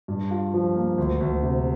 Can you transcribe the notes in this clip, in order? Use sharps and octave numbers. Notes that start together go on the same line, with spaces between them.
G2
F4
F3
A#3
D2
D2
C3